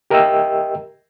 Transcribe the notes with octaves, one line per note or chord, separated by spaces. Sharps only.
G4 A#4 D#5 E5 G5 E6